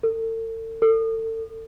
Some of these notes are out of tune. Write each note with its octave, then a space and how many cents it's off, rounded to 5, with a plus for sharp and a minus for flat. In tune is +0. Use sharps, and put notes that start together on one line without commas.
A4 +40
A4 +35